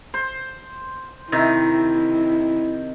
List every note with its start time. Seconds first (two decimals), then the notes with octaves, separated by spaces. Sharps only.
0.14 C5
1.32 C3 D#3 E4